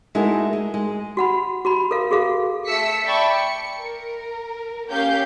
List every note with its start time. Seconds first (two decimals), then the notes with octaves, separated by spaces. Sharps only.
0.15 G#3 A3 D#4 E4 F#4 A#4
0.53 G#3
0.74 G#3
1.17 F#4 F#5 B5
1.65 F#4 A#5 B5
1.91 A4 A#4 F5
2.11 F#4 G#4 A4 F5
2.67 A3 E6 B6 C#7
3.04 D5 E5 G5 A5 B5 C#6
3.33 C#7
3.80 A#4
4.89 A#3 C#4 G4 F5 G6